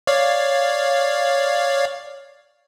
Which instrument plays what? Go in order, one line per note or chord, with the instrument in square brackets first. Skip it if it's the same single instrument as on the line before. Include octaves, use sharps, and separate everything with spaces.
[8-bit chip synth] C#5 D5 F5